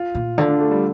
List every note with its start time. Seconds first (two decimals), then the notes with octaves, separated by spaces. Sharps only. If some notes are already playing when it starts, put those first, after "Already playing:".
Already playing: F4
0.15 A#2
0.38 D3 F4
0.48 D4
0.60 A3
0.71 G3